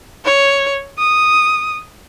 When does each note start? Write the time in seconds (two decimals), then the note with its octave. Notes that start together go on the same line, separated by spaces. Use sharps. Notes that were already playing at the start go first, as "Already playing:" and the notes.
0.25 C#5
0.99 D#6